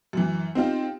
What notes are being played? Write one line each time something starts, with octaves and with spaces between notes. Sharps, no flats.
F#2 E3
C4 D#4 F4 G4